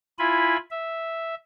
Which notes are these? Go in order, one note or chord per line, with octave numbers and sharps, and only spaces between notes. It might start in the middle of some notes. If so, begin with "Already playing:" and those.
E4 F4 G#5 B5
E5